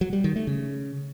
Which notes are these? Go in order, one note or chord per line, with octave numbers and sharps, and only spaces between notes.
F#3
G3
D#3
A3
C#3